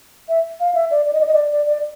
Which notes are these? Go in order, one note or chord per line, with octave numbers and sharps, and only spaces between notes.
E5
F5
E5
D5
D5
D#5
D5
D#5
D5
D5
D5